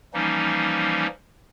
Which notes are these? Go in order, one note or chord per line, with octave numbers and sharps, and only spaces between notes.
E3 F3 G3 A#3 C#4 D#4